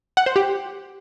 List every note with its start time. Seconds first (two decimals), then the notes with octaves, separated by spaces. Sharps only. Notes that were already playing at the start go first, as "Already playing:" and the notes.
0.17 F#5
0.26 C5
0.36 G4